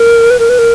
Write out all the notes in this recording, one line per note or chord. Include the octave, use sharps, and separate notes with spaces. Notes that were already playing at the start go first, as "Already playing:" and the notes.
Already playing: A#4
B4
A#4
B4
A#4